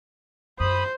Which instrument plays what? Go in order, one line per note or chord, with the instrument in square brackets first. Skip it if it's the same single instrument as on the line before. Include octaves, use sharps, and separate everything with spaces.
[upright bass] F#2 [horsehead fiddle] C5 [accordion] B5 D#6